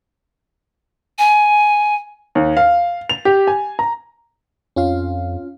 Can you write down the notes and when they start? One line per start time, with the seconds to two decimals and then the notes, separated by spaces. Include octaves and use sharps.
1.19 G#5
2.35 D#2
2.57 F5
3.10 F7
3.25 G4
3.47 G#5
3.79 A#5
4.76 F2 C#4 F4 F5